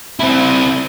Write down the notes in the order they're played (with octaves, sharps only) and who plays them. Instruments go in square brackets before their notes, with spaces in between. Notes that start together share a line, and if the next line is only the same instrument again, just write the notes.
[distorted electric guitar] C4 E4